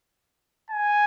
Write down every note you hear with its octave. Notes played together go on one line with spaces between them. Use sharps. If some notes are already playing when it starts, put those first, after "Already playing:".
G#5